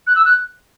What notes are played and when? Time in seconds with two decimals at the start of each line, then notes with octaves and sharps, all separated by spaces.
0.07 F#6
0.16 E6
0.25 F#6